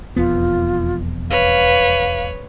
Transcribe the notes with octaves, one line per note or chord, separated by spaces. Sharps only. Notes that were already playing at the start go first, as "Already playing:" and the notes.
E1 F2 B3 F4
B4 C#5 F5